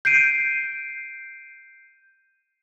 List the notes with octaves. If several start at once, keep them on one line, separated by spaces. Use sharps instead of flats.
G6 C7 D7 D#7